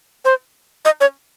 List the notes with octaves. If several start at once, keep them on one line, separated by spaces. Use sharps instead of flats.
C5
D#5
C#5